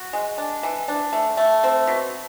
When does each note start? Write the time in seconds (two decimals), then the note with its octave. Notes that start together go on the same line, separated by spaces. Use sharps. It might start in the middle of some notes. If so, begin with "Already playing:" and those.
Already playing: F#4
0.13 G#3
0.38 D4
0.63 E3
0.88 D4
1.13 A3
1.37 A3
1.64 C4
1.87 B2